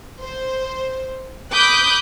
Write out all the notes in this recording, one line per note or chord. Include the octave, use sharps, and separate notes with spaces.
C5
B5 D6 D#6 F#6 G6